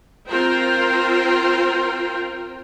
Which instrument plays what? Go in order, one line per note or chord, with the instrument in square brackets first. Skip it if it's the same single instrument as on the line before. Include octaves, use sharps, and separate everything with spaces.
[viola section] C4 F4 A#4 C5 G5